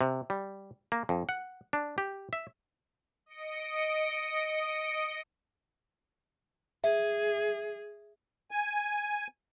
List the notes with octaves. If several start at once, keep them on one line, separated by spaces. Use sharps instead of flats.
C3
G3
A#3
F2
F#5
D4
G4
E5
D#5 C#7 D7
G#4 E5
G#5